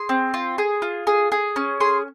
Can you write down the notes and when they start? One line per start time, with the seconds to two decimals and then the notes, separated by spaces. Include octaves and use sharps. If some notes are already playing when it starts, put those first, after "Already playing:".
Already playing: G#4 C6
0.09 C4
0.34 F4
0.58 G#4
0.82 F4
1.07 G#4
1.32 G#4
1.56 C#4
1.80 G#4 C6